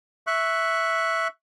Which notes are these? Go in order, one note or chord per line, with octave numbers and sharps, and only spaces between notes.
E5 C#6 F#6